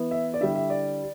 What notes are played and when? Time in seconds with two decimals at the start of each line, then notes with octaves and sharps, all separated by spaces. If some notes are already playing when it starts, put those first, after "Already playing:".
Already playing: E3 B3 E4
0.11 E5
0.34 D5
0.41 D3 G3 E4 E5
0.55 E5
0.70 D5